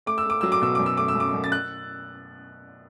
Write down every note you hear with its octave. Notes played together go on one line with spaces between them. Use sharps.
A3 D6
E6
A3 D6
F#3 E6
D6
B2 E6
F#2 D6
E6
A3 D6
E6
F#2 D6
F#2
A6
F#6